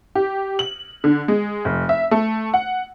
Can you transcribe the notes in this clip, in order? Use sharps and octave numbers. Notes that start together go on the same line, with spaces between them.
G4
F#7
D3
G#3
F1
E5
A3
F#5